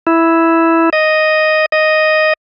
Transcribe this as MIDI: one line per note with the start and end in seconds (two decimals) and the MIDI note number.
0.07 0.90 64
0.93 1.66 75
1.72 2.33 75